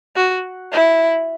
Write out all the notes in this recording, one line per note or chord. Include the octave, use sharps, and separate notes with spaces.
F#4
E4